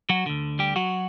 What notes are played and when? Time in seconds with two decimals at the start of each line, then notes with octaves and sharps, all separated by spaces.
0.09 F#3 F#4
0.26 D2 D3
0.59 G3 G4
0.76 F#3 F#4